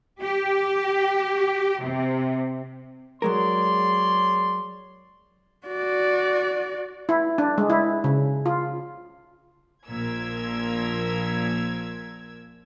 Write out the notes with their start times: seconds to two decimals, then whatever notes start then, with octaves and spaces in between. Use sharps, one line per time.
0.21 G4
1.82 C3
3.22 F#3 G#3 A#4 C#5 D5 C6
5.67 F#4 D5
7.09 E4
7.38 D4
7.58 G#3
7.70 E4
8.04 C#3
8.46 F4
9.86 A#1 A#2 F3 A#4 E6 G#6